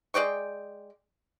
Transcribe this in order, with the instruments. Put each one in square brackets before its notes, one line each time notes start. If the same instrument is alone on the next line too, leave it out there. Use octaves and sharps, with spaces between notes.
[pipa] G#3 D5 G5 C#6